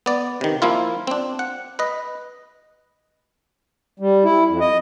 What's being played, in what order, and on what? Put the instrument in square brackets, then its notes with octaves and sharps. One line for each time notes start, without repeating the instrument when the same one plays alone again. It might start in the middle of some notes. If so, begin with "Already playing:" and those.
[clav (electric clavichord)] B3 D5
C3 D#3
F3 A#3 E4 F4
C4 D4
F#5
B4 D#5
[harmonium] G3
E4
F2
D#5